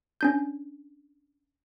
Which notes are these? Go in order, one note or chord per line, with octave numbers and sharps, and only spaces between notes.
C#4 D4 G6